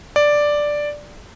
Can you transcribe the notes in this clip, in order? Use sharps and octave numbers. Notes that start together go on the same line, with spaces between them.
D5